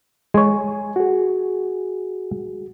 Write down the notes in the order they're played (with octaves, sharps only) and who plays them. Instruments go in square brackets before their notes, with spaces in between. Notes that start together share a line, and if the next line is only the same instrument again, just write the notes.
[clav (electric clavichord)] G#3 C#5 [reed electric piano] G#5
[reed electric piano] F#4 G#4